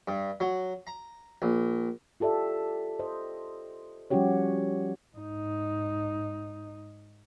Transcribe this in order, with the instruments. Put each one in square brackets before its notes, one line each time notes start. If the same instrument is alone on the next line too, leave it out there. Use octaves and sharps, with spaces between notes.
[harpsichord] G2
F#3
A#5
A#1
[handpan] F4 G4 A4 D5 E5
C5 D#5
F3 G3 C#4 F#4 G4 C#5
[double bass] G#2 D#4